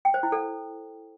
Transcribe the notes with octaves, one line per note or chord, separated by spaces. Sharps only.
G5
C5
E4
A4